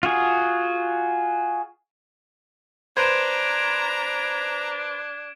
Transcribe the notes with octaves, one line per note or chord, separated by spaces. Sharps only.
F4 F#4 G#4
D4 B4 C5 A#5 G#6 D7 E7